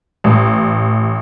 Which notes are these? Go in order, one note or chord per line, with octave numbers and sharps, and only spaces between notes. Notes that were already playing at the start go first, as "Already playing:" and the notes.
A1